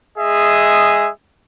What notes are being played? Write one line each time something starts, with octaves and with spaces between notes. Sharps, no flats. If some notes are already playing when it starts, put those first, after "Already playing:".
G#3 G#4 D#5 E5